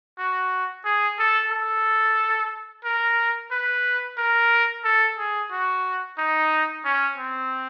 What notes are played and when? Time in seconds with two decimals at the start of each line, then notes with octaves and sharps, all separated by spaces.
0.18 F#4
0.85 G#4
1.19 A4
1.52 A4
2.85 A#4
3.51 B4
4.18 A#4
4.84 A4
5.18 G#4
5.52 F#4
6.19 D#4
6.85 C#4
7.18 C4